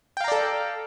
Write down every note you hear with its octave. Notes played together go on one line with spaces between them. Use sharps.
A4 D5 F5 G5 A#5